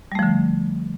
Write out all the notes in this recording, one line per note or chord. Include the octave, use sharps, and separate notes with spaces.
D3 F3 G3 A3